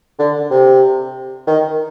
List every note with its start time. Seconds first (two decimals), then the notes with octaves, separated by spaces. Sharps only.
0.19 D3
0.51 C3
1.47 D#3